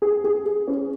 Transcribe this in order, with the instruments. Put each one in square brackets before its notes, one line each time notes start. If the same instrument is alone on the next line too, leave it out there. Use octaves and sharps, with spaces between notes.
[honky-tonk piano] G#4
G#4
G#4
C#4